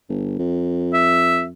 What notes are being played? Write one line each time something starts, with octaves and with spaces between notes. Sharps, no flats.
G1
F2
E5